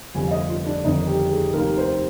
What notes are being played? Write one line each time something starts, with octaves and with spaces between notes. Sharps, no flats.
G1 F2 C3 G#5
F5
D#5
F4
D4
G1 F2 D#3 D#4
G4
G#4
F1 D#2 D#3 A#4
C5